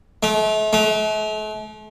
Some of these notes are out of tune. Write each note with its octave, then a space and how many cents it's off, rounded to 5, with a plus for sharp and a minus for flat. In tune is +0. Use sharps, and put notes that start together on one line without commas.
A3 -40
A3 -45